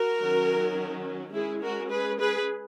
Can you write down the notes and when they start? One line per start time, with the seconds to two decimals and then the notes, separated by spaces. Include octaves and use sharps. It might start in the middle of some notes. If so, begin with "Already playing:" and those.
Already playing: F#4 A#4
0.18 D#3 F#3 C#4
1.33 G#3 C#4 E4 G#4
1.61 F#4 A#4
1.90 G#4 B4
2.19 G#4 B4